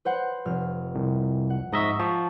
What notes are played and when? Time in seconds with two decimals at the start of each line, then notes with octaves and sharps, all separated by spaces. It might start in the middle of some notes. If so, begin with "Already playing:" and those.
0.05 B4 C5 F#5
0.45 F1 F6
0.95 C2
1.50 F#5
1.72 G#2 D#5 E5 A#5 C#6
1.99 F3 A5 C#6